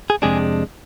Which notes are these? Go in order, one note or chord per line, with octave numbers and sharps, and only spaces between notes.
G#4
F2 C3 G#3 D4 G#4